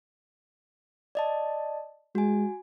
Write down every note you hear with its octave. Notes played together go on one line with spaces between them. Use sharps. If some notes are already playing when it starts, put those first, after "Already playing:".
D5 D#5 A5
G#3 F#4 G#5